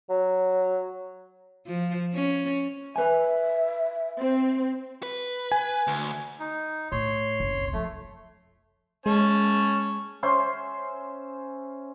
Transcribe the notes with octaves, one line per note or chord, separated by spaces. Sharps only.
F#3
F3
C#4
B4 E5 G#5
C4
B4
G#5
D2
D#4
A2 C#5 C6
F#1 C2
F3 A3
G#3 C#4 C#5 A5
C#4 C5 E5 C6